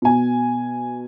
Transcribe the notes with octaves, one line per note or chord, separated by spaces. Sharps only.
B2 G#5